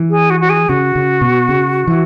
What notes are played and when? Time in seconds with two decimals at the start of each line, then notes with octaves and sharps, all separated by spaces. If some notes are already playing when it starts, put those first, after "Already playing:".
Already playing: E3
0.10 G#4
0.30 F#4
0.40 F#4
0.49 G#4
0.69 C#3 F#4
0.96 C#3
1.21 B2
1.49 C#3
1.87 E3